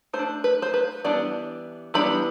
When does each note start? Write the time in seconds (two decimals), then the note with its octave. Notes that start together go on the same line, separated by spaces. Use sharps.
0.13 A3 C5
0.19 D4
0.44 B4
0.62 C5
0.74 B4
1.04 E3 G3 B3 D4 D5
1.94 E3 G3 B3 D4 B5